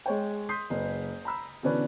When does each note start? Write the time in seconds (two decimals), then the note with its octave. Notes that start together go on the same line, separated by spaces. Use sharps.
0.06 G#3 C#5 G5
0.49 C6 D#6 G6 B6 C7
0.70 F#1 B4
1.25 A#5 B5 E6
1.63 B2 D3 E3 C#4 D4 B4